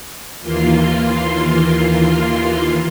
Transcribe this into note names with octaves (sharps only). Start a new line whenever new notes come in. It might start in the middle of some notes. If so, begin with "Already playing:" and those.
D#2 E3 A#3 F4 C6